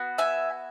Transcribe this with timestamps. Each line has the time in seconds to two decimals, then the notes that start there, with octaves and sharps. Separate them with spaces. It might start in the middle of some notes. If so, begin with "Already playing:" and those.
Already playing: B3 F#4
0.18 E5 G#5